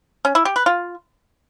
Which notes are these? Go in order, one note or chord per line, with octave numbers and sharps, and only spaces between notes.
C#4
E4
G4
B4
F4